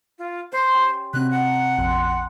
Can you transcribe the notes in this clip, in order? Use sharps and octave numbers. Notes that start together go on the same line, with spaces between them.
F4
C5 C6
C#4 G4 G5
C3 F#3 C4 D#5 B5 F#6
F5 F#5 A5 A#5
A#1 F2 G5 C6 E6